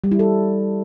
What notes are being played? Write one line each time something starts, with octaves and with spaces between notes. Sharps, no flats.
G3
E4
A4